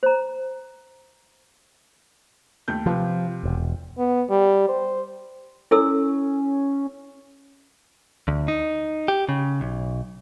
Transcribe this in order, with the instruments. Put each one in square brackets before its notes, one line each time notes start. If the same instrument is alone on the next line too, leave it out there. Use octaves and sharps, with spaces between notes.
[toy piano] C5 A#5
[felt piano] D#2 A3 G6
[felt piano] C3 F4 B4 [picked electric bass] F3
[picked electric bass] E1
[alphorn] B3
G3
C5
[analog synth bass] C#4 [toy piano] E4 A4 E6
[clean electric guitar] D2
D#4
G4
C#3
B1